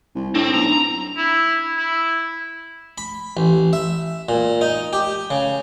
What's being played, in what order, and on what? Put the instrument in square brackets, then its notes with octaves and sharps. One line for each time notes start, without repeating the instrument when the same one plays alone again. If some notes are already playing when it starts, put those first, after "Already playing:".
[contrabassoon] C2
[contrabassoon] A2 [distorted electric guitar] C4 [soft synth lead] D4
[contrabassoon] B1 [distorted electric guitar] A#5
[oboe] E4
E4
[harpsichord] B5
A1
E5
A#2
D#4
G4
C#3